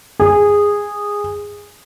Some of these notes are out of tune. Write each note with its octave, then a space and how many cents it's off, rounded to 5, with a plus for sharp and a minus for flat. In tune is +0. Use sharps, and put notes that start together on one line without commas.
G#4 -15